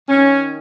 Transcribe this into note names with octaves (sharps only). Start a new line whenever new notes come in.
D#3 C#4